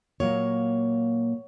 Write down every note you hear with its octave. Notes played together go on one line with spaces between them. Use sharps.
A#2 F#3 A#3 C#5